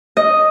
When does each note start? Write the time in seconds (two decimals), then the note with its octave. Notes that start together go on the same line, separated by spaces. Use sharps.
0.17 D#5